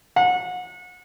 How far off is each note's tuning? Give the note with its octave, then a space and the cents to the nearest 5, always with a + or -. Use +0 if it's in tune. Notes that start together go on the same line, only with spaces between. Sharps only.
F#5 -30